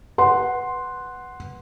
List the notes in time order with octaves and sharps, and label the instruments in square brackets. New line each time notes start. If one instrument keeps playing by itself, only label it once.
[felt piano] B4 F#5 C6